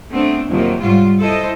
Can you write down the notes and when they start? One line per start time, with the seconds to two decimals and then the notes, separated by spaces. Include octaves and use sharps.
0.10 A3 B3 C4 D4
0.49 F2 C3 D#3 F#3 A#3
0.81 G#2 F#3 G3 F4
1.19 E4 A4 C5 D#5